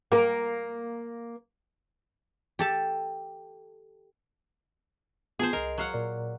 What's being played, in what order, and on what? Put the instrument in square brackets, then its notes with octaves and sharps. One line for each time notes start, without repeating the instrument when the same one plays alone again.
[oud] A#3 A#4
[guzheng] G4 A4 A5
[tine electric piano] B3 F4 A5 [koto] G#4 C5
[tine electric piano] C2 D#5 [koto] A#4
[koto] F#3 F5 F#5
[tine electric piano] A#2 A#4 D5